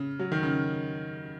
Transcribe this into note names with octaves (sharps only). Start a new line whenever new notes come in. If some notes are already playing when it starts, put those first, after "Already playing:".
Already playing: C#3
F#3
D#3
C#3